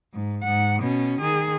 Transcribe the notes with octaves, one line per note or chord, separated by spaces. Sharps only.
G#2
G#2 F#5
B2 C#4
D#3 G#4